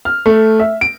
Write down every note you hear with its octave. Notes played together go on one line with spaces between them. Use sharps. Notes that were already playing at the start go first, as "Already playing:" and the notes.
F6
A3
E5
D7